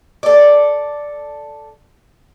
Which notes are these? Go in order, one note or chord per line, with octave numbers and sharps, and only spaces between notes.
A4 D5